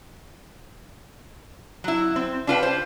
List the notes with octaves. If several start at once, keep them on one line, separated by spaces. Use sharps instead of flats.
F#3 E4
C4
D4 F4 B4 G5
C5